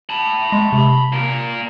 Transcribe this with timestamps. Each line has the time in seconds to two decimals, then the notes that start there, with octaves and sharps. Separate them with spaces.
0.09 A5 B5
0.52 G#3
0.72 C3
1.12 A#2 A#4